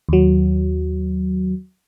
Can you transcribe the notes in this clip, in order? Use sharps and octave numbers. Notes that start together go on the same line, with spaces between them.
D#2 F#3